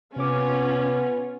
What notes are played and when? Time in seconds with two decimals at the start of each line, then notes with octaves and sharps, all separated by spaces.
0.16 C3 B3 C#4 F4 C#5 D6